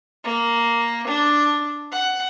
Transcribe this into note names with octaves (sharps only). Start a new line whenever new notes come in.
A#3
D4
F#5